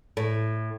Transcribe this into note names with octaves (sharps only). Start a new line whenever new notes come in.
A2